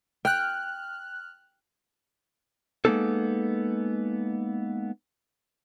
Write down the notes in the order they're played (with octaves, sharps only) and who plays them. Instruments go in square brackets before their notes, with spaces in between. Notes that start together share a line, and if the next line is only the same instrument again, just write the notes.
[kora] G5 [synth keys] F6 F#6
[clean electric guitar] G#3 A#3 B3 D4 D#4 A4